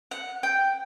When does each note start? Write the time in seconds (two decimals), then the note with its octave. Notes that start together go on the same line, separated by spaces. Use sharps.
0.11 F#5
0.43 G5